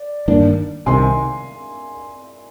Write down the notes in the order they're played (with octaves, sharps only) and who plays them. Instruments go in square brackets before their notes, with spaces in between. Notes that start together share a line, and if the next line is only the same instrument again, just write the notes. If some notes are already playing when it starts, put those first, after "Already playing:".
Already playing: [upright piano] D5
[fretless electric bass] G2 D#3 A#3 D4
[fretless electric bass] C2 C3 D#3 [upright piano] G#5 C6